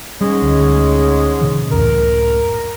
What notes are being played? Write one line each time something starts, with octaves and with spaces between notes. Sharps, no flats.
G#2 G3 G#3 C#4
D2
A#2 C#3 E3
C#2 F#2 A2 A#4